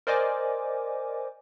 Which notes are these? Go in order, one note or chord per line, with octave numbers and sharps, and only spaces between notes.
A#4 C5 D5 D#5 G#5 D6